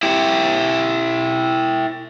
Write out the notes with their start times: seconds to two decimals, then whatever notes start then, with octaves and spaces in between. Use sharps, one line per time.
0.03 E4 G4